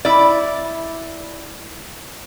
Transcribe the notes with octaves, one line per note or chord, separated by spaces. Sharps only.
E4 D5